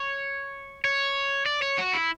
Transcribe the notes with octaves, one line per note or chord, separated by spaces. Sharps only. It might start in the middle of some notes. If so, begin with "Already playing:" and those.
Already playing: C#5
C#5
D5
C#5
F#4
E4